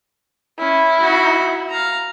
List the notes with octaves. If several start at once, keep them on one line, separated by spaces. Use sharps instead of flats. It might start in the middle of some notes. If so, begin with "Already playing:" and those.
C#4 E4
F#4
F5 A#5